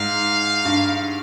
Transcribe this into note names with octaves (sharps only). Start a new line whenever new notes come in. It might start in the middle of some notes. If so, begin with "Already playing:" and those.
Already playing: G#2 F5
G2